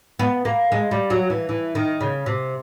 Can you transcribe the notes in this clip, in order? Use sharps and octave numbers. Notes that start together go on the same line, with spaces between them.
B3
A#3
G#3
G3
F#3
E3
E3
D#3
C#3
C3